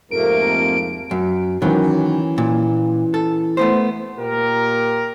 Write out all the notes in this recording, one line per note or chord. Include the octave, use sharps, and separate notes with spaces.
F2 G#2 C3 F3 A3 A#3 A#4 D7
F#2
D#3 E3 F#3 A#3 C#4
A#2
A4
A3 B3 C5
A#2 G4 A#4